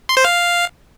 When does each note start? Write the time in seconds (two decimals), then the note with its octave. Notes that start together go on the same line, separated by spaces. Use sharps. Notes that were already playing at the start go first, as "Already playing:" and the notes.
0.09 C6
0.17 C5
0.24 F5